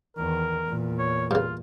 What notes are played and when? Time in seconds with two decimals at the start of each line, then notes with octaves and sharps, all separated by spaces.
0.17 E2 D#3 A#4
0.65 E2 A#2
0.98 C#5
1.31 G2 C#3 F4